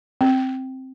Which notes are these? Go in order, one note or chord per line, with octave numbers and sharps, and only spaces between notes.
C4